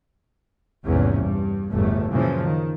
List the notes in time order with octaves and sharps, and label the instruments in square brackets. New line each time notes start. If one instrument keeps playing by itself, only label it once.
[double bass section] A#1 E2 G#2 C3 C#4
G2
G1 E2 A2 A3
F#2 A#2 C#3 E3 F3
D#3